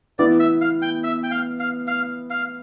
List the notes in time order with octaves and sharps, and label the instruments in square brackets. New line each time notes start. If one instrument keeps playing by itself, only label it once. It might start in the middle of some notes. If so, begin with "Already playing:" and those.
[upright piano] E3 B3 E4 [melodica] D5
[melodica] E5
F5
G5
E5
G5
F5
F5
F5
F5